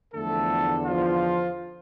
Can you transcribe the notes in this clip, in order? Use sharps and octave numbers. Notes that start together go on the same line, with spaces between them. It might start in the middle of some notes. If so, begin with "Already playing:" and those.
E2 D3 F3 A3 A4
F3 F4